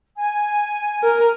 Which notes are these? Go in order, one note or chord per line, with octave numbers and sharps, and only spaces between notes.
G#5
A#4